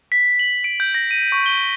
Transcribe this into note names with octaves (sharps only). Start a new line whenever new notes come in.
B6
F#7
D7
G6
A#6
D#7
C#6
G7